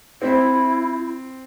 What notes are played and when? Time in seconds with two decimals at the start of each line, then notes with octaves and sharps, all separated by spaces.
0.22 C4 E4